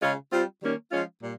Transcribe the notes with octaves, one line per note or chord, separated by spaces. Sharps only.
C#3 G#3 C#4 F4
G3 C4 F4
D#3 G3 A#3 C#4
F3 G#3 C#4 F4
A#2 G3